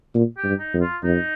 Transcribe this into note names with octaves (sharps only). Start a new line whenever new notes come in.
A#2
G4
G2
D#4
F2
F4
F2 D#4